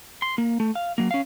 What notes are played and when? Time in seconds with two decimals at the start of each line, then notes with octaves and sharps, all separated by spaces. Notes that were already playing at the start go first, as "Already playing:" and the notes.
0.22 C6
0.38 A#3
0.60 A3
0.75 F5
0.98 F#3 A#3
1.11 C#4 F5